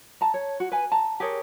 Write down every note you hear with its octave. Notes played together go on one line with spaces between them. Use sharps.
A5 A#5
C#5
F#4
B4 G#5
A5 A#5
G4 G#4 A#4 C#5